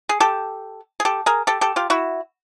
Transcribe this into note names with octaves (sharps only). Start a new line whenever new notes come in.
G#4
G4 A4
G#4
G4 A4
G#4 A#4
G4 A4
G4 A4
F4 G4
E4 F#4